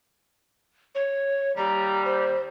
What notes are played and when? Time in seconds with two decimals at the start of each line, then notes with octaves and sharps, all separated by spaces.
0.95 C#5
1.57 D#2 G3 A#5
2.06 C5